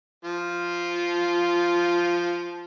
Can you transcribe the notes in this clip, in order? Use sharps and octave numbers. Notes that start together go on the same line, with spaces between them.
F3 F4